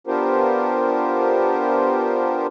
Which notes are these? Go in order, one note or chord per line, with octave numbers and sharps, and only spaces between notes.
B3 D4 F4 G4 A#4 C5